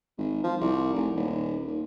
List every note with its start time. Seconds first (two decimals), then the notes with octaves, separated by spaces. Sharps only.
0.18 G#1
0.44 F3
0.61 C2
0.94 F1
1.15 D#1
1.67 D#2